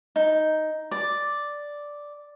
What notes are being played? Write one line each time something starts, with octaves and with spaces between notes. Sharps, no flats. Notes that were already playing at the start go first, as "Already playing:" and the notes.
D#4
D5